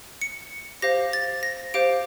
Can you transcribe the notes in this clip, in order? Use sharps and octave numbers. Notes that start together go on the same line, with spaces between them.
C#7
G4 C5 F5 A#6
A6
A#6
G4 C5 F5 D7